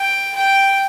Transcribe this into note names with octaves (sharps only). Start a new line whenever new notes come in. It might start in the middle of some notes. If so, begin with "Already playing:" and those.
Already playing: G5
G5